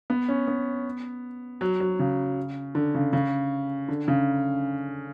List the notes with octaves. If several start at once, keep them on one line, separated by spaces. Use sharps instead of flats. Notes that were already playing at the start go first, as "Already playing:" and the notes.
B3
C#4
B3
F#3
F#3
C#3
D3
C#3
C#3
D3
C#3